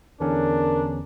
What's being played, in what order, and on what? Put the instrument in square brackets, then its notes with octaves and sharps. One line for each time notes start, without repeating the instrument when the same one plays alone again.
[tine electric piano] E2 D3 C#4 [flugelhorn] D4 [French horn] A#4